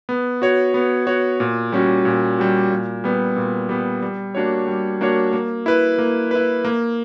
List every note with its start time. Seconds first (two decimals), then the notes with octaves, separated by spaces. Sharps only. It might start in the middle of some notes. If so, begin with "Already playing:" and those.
0.09 B3
0.42 F#4 C#5
0.74 B3
1.07 F#4 C#5
1.40 A#2
1.72 G3 C#4 F#4
2.05 A#2
2.38 G3 C#4 F#4
2.70 A#2
3.04 G3 B3
3.36 A#2
3.69 G3 B3
4.02 G3
4.35 A#3 D4 F#4 C#5
4.67 G3
5.01 A#3 D4 F#4 C#5
5.33 A#3
5.66 E4 B4
5.98 A#3
6.31 E4 B4
6.65 A#3